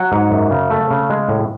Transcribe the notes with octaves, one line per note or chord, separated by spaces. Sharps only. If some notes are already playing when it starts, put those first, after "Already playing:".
Already playing: F#3 F#5
G#2
F#2
C#3
A3
C#3
G#3
A2